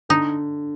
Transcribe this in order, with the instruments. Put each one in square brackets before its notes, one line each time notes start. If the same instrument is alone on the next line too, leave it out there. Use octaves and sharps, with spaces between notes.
[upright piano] D3 [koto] D#4